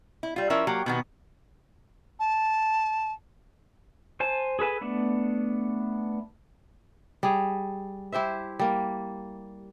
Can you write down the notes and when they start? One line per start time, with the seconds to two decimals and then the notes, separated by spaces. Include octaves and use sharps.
0.23 E4
0.36 G3 F4
0.50 F3 C#4 E4 A#4 E5
0.67 F#3 A#3 G4
0.86 B2 D#3 B3
2.20 A5
4.20 C5 G#5 A5
4.59 G#4 A4 B4 G#5
4.81 A3 B3 D4
7.23 G3 G#4
8.12 E4 G4 C5 E5
8.59 G3 A#3